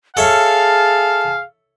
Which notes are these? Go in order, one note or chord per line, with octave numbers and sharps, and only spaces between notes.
G#4 A4 C#5 E5 F5 A5